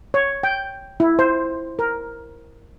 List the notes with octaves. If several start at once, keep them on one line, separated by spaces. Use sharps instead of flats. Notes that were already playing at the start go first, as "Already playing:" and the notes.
C#5
G5
E4
C5
A#4